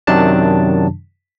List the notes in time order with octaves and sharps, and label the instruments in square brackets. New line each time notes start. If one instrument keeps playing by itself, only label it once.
[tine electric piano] F#2 C3 D#3 F#3 D4 A5